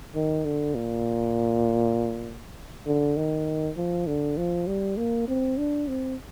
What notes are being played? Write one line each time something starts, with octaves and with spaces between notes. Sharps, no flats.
D#3
D3
A#2
D3
D#3
F3
D3
F3
G3
A#3
C4
D4
C4